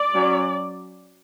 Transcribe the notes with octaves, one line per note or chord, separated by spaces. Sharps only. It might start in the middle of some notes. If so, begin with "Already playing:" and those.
Already playing: D5
F#3 C#4